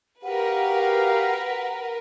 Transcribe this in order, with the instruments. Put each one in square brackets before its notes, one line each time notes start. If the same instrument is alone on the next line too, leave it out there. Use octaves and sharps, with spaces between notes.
[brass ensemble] F#4 G4 F5 [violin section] A#4 B4 [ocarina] F#5